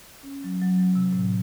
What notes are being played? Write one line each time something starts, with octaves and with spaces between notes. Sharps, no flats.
C#4
F#3
F#3
C3
A2